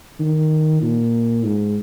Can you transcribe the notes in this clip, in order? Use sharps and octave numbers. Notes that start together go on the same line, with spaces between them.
D#3
A#2
G#2